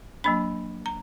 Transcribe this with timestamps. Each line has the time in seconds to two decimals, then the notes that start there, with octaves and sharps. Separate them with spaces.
0.24 F#3 A#3 D4 B5
0.86 A#5